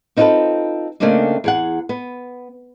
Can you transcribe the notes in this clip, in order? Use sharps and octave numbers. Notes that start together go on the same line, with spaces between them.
C4 D#4 F4 G4 A4 B4
C#3 A3 A#3 C4 D4 D#4
E2 G#4 F#5
B3